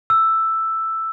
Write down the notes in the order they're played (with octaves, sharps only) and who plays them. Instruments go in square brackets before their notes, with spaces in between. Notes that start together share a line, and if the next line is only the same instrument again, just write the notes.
[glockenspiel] E6